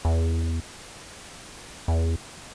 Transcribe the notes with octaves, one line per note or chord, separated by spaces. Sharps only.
E2
E2